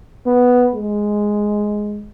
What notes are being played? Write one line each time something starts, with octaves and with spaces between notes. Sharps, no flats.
B3
G#3